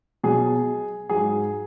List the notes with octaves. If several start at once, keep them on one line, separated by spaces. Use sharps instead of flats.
B2 F#3 G#4
G#2 F#3 G#4